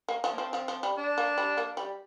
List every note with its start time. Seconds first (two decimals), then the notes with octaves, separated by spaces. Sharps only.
0.09 A#3
0.24 F3
0.33 A#3
0.38 F3 C4
0.53 F3
0.68 F3
0.83 G3
0.97 D4
1.18 A#3
1.38 G3
1.57 A#3
1.77 G3